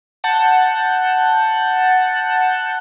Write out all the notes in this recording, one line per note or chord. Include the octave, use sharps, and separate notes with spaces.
F#5 A5 G6